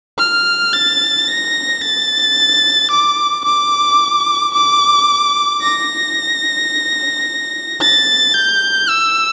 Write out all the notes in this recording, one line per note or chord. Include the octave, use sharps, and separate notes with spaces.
F6
A6
A#6
A6
D6
D6
D6
A#6
A6
G6
E6